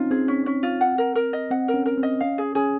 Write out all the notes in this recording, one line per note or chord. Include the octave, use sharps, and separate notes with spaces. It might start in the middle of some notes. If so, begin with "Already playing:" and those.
Already playing: C4 C#4 D#4 F4
C4 G#4
C#4
C#4
F4
F#5
A#4
A#4
D#5
C4 F#5
A#4
C#4
A#4
C4
D#5
C#4 F5
G#4
C#4 G#4